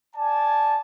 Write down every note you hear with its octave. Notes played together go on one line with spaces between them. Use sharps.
D5 G#5 A5